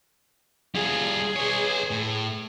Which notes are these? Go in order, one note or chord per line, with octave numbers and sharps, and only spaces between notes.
G3 F4 G#4
B4 C#5
A2